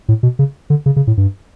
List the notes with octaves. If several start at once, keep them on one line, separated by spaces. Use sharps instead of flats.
A2
B2
C#3
D3
C#3
C#3
A2
G2